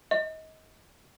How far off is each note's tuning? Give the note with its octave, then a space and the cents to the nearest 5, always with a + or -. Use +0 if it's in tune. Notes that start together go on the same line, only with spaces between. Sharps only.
D#5 +30